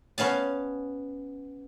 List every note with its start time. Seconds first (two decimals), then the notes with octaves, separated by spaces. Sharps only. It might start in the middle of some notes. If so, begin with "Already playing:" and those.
0.18 B3 C#4 F5 A5